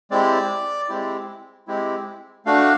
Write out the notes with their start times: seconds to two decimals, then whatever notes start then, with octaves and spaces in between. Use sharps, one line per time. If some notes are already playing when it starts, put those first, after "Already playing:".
0.11 G#3 C4 E4 G4 D5
0.89 G#3 C4 E4 G4
1.67 G#3 C4 E4 G4
2.45 A3 D4 F#4 F5